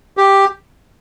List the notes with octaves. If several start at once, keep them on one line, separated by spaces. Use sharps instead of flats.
G4